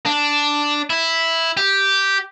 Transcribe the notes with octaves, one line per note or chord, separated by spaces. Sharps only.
D4
E4
G4